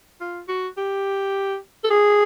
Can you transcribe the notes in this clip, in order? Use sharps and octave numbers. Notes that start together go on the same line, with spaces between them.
F4
F#4
G4
A4
G#4